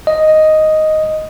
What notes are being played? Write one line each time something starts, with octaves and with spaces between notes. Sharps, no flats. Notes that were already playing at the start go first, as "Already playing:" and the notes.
D#5